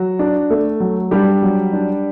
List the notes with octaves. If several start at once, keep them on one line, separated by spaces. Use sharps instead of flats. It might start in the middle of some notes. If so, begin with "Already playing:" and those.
Already playing: F#3 F#4
D4
A3
F#3
G3 D4 G4
F#3
D4